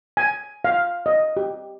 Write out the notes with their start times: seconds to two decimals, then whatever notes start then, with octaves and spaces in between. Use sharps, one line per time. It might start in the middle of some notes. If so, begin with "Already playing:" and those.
0.17 G#5
0.65 F5
1.06 D#5
1.37 G4